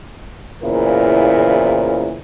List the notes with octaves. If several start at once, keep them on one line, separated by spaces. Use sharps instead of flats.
E2 A#2 C#3 E4 A#4 C5